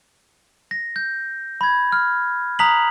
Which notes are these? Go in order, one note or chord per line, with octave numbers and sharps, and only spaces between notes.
A#6
G6
B5 G#6
F6
A#5 D#6 F#6 B6 F7 F#7